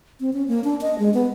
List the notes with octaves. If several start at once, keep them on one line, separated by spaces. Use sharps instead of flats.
C4
C#4
A#3
D4
D#5
G#3
B3